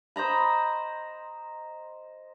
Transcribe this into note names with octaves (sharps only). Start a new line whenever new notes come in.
C5 D#5 A#5 B5